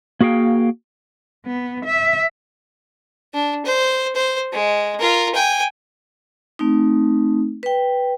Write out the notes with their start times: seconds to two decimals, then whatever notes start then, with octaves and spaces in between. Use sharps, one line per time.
0.21 A#3 F#4 G#4 F5 G5
1.46 B3
1.85 E5
3.34 D4
3.65 C5
4.15 C5
4.53 G#3
5.00 F4 A#4
5.34 G5 G#5
6.59 A3 C4 D#4
7.63 B4 G5